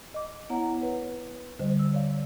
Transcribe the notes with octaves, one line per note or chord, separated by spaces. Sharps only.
D#5 D6
B3 E4 C#5 F#5 A#5
B4 C#5
D3 G3 C5 D#5
E6
C#5 D5 F5